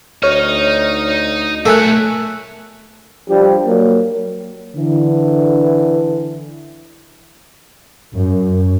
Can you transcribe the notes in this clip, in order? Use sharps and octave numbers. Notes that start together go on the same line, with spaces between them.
D2 D#4 C#5 D#5 F6
B2 A3 A#4 C#5 G#5 F#6
F3 G3 D4 G4
F#3 A#3
D3 E3
F#2